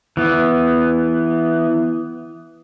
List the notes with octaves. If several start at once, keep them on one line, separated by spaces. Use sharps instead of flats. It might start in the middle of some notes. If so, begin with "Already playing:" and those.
E3 B3